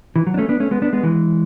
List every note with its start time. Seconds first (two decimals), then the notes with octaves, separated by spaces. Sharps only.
0.16 E3
0.27 F#3
0.34 D4
0.38 A3 C#4
0.49 B3 D4
0.60 A3 C#4
0.71 G#3 B3
0.82 B3 D4
0.93 G#3 B3
1.03 E3 G#3